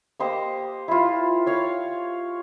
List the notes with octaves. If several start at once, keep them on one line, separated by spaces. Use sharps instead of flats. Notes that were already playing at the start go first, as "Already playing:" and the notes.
A#3 G4 C5 D#5
E4 F4
C#5 F5